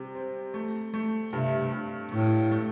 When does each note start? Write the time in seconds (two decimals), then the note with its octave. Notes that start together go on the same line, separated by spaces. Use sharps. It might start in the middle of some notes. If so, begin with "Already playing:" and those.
Already playing: C3 G3
0.15 C4
0.54 A3
0.94 A3
1.33 G2 C3
1.72 G2
2.12 A2 A3
2.51 A3